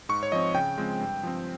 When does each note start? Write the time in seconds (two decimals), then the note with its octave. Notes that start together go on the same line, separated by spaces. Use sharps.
0.09 G#2 C#6
0.23 C#5
0.32 F3 C4 D#5
0.55 C#3 G5
0.78 F3 G#3 C4
1.00 G2
1.23 F3 C4